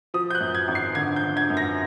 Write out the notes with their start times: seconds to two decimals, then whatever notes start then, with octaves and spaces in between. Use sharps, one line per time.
0.14 F3 D#6
0.31 G6
0.35 F#6
0.41 F#2
0.55 G#6
0.68 G#1
0.75 C7
0.95 D3 G#6
1.16 G6
1.24 D3
1.37 G#6
1.50 F#2
1.57 A#6